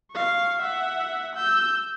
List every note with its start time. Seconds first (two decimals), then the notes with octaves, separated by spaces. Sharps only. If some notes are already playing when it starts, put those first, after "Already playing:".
0.11 F5 C#6
0.60 E5 F#5
1.35 E6 G6